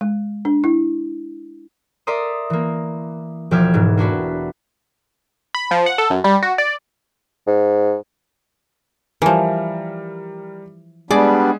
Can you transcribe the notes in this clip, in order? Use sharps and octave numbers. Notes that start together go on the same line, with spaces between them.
G#3
D4
E4
A#4 D5 E5 A#5 C6 D#6
E3 A#3
E1 F3 G4 E5 F6 G#6
G#2 B2 E3
A#3 D4 F#4 B4
B5
F3
F#5
A4
F#2
G3
F#4
D5
G#2
E3 F3 G3 A#4
G3 G#3 B3 D4 G#4 D5